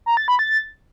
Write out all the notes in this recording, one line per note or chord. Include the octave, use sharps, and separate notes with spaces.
A#5
A6
B5
A6